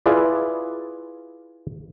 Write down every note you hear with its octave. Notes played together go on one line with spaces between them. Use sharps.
E4 F4 G#4 B4 D5